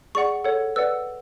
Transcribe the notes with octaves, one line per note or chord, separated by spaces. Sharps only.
G#4 D5 F#5 C#6
A4 C#5 F#5
B4 D5 F#5 E6